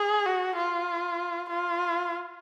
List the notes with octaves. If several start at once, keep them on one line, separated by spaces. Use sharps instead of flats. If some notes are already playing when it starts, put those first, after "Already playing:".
Already playing: G#4
F#4
F4
F4